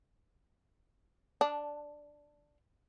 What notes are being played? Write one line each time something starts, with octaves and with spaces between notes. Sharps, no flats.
D4